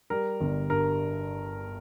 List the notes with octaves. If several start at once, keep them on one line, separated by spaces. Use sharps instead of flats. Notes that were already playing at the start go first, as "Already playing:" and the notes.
G3 A#4
G1
G2 A#4